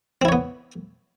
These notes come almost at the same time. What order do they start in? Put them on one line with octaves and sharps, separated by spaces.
C4 E4 C#5 B3